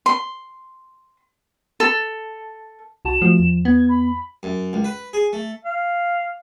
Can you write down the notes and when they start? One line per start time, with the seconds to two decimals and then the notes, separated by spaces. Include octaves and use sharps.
0.06 C6
1.80 A4
3.05 C2 F#4 A5 E7
3.22 F3 A3 F#4
3.39 E2
3.65 B3 G#6
3.88 B5
4.43 F#2
4.73 C#2
4.84 B4
5.13 G#4
5.33 A3
5.65 F5